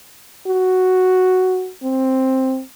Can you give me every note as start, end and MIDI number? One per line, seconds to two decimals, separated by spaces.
0.47 1.71 66
1.83 2.62 60